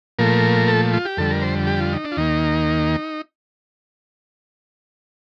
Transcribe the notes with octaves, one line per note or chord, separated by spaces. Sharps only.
A#2 F3 A3 A#4
A4
F4
G4
F2 D3 G3 A4
A#4
C5
G4
F4
D#4
D4
F4
D#2 D#3 A#3 D#4